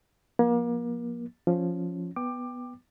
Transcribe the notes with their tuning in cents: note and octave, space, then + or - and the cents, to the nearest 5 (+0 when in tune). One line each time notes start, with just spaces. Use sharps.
F3 +10 A#3 +30
F3 +0 C#4 +0
B3 +0 G5 +5 D6 +20